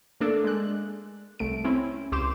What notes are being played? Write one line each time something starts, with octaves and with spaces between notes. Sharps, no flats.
A3 A#3 D4 A4 D5
G#3 F#6
C2 A3 D7
C4 C#4 E4
C#2 G4 C6 D6 E7